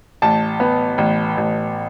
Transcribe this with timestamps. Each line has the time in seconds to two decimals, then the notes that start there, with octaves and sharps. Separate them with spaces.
0.22 A1 A5
0.60 B3
0.98 A1
1.37 A1